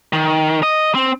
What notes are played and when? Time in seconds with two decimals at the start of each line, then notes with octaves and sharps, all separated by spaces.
0.13 D#3
0.63 D#5
0.95 C4